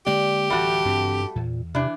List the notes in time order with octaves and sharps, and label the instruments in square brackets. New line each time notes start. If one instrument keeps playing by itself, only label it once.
[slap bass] D3 G#3 A#3 [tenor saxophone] G4 [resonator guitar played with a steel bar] D5
[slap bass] D1 E3 [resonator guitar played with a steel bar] G3 A3 F#4
[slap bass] F#1 E3 C4 [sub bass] G2
[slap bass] E2 [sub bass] A#2
[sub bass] C3 [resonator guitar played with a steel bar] E3 D4